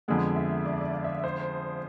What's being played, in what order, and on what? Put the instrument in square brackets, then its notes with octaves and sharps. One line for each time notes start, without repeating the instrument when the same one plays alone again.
[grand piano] F2 D3 G#3 B3
[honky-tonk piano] E5
D5
E5
D5
F5
E5
D5
C5